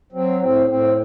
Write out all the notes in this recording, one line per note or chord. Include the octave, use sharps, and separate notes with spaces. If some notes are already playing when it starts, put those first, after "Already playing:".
F#3 C4
A2 C4
A2 C4